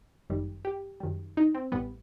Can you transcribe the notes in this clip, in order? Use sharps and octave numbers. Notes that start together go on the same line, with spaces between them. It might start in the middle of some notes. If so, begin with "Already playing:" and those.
G1 F#2 D#3 G3
G4
F#2 D#3 G3
D#4
C4
A1 A2 G3 B3